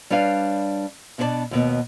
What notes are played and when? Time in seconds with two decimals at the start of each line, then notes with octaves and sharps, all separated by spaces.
0.10 G3 D4 B4 C#5 F5
1.18 B2 B3 D4 C5 D5 A5
1.51 D#2 B2 B3